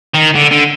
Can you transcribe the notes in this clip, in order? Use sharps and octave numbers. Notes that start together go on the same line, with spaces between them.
D#3
D3
D3